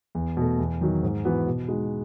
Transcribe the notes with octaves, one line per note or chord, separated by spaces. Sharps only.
E2
B2 A3
E2
D#3 F#3
G#2
E3 B3 F#4
B2
G#3 D#4 F#4